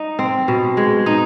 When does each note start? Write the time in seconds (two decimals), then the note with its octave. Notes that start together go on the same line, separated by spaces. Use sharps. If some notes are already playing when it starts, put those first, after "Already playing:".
Already playing: D#4
0.19 C4
0.48 B2
0.77 G#3
1.06 D#4